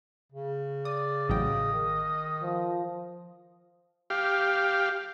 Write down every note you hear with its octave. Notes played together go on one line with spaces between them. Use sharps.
C#3
D5 D#6
A1 F#3 D#5 G5
D#3
F3
G4 F5